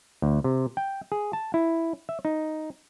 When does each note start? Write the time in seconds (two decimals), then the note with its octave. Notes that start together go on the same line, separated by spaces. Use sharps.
0.22 D2
0.44 C3
0.77 G5
1.12 G#4
1.33 A5
1.54 E4
2.09 E5
2.25 D#4